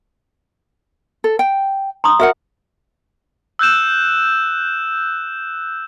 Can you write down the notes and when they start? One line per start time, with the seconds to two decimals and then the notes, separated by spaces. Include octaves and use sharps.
1.24 A4
1.39 G5
2.04 A#5 C6 D#6
2.20 F#4 A#4 E5 F#5
3.59 E6 F#6 G6 E7